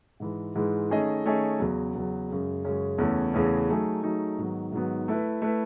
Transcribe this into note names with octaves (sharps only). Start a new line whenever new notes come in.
G#2 E3 G#3
G#2 E3 G#3
D#3 A3 C#4 G#4 D#5
D#3 A3 C#4 G#4 D#5
E2 C#3 F#3
E2 C#3 F#3
F#2 C#3 G#3 C#4
F#2 C#3 G#3 C#4
E2 C#3 E3 A3 C#4
E2 C#3 E3 A3 C#4
F#3 A3 D#4 G#4
F#3 A3 D#4 G#4
G#2 D#3 F#3 B3
G#2 D#3 F#3 B3
A3 E4 B4
A3 E4 B4